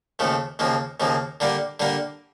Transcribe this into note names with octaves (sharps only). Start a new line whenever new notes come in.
D#2 C#3 F3 A3
D#2 C#3 F3 A#3
D#2 C#3 F3 A#3
D3 G3 A#3 D4
D3 G3 A#3 D4